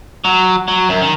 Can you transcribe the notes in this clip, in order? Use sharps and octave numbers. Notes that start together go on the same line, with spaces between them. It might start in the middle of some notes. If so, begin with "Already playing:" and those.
F#3
F#3
F#2
D#3